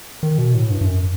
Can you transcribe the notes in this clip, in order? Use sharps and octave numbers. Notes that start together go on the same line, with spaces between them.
D#3
B2
A2
G2
G2
F#2